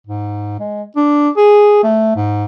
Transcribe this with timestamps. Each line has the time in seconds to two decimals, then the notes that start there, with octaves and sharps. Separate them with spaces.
0.07 G#2
0.60 G#3
0.97 D4
1.37 G#4
1.84 A3
2.16 G#2